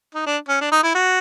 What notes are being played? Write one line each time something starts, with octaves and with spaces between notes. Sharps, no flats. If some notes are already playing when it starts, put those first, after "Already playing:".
D#4
D4
C#4
D4
D#4
E4
F#4